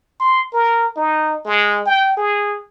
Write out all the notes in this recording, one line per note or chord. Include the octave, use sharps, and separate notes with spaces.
C6
A#4
D#4
G#3
G5
G#4